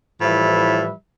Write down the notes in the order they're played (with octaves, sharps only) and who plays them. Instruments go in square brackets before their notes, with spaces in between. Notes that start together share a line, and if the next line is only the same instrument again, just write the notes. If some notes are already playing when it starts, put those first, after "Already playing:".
[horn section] A2 E3 F3 G3 B4 E5